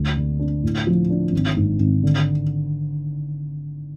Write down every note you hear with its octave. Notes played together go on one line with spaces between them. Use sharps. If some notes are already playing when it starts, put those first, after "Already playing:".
Already playing: D2
D3
D4
A2
F3
D4
G#1
G#2
G#1
D3